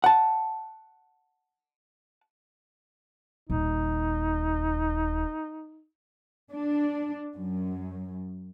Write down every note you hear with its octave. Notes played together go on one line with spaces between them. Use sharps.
F#5 A5
D#1 D#4
D4
F#2